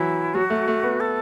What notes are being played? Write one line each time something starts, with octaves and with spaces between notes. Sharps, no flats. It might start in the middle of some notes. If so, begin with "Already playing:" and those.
Already playing: E3 F#3 E4
F#3 F#4
A3
A3
B3
A4